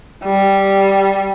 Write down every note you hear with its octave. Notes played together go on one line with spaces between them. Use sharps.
G3